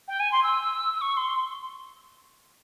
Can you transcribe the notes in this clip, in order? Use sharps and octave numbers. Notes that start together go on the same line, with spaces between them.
G5
G#5
C6
E6
E6
C#6
C6